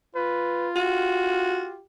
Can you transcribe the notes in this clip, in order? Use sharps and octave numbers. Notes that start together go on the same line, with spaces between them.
F4 B4
F#4 G4